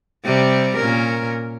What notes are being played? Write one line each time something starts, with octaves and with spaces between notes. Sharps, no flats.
C3 G3
A#2 C#4 A#4